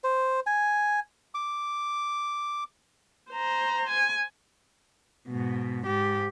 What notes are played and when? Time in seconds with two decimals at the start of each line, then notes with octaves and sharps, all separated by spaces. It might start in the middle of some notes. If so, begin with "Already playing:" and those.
0.04 C5
0.47 G#5
1.35 D6
3.31 C5 A#5
3.90 G#5
5.29 G#2 B2
5.85 G#2 G4